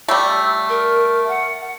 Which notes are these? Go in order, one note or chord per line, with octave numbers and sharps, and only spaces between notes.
G3 A3 E6
A#4
F#5